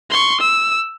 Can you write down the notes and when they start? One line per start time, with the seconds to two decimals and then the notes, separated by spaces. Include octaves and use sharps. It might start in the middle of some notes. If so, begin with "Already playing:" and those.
0.11 C6 C#6
0.40 E6